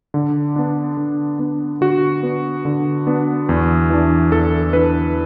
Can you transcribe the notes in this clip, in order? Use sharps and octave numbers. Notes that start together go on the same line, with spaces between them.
D3
B3 D4
D3
B3 D4
D3 F#4
B3 D4
D3
B3 D4
E2
E3 D4
E2 A4
E3 D4 B4